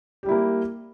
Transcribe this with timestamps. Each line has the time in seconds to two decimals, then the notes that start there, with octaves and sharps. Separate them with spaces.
0.23 G4
0.26 G3
0.29 E4
0.31 A#3